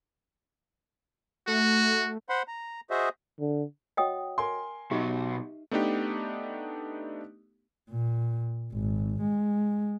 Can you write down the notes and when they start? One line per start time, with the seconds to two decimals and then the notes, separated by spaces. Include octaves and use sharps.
1.47 A3 F#4
2.29 C5 F#5 B5 C6
2.48 A#5
2.90 F#4 G#4 C5 D#5 E5
3.40 D3
3.97 F#4 C#5 D#5 F#5 G5 D#6
4.38 A#4 G#5 C6
4.91 B2 F#3 D#4 F#4 G4 D#5 E5
5.71 A3 B3 D4 D#4 G4
7.90 A#2
8.73 G#1
9.21 G#3